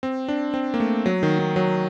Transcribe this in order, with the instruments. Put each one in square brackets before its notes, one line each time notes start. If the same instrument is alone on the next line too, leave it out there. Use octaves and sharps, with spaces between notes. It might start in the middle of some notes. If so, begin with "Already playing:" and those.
[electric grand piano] C4
D4
C4
A#3
A3
F#3
D#3
D#3
F#3